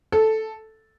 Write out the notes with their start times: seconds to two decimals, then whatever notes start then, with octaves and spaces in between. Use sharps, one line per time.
0.12 A4